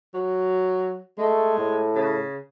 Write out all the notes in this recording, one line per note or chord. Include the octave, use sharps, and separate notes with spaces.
F#3
G#3 A3
A2
C#3